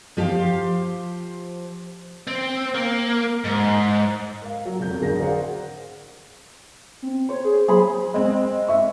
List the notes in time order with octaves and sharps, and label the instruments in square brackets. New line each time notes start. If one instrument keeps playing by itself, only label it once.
[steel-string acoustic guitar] F3 G4 C5 F5
[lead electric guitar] C4
A#3
G#2
[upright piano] A#4 F5
F#3
E1 F2 G6
G#1 D3 F#3 G#4 A#4 A#6
G#4 C5 D5 F5 F#5
[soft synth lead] C4
[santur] C5 [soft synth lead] C#5
[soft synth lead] G#4
[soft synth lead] F#3 [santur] G#4 C5 B5
[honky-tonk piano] G#3 C4
[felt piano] E5 C#6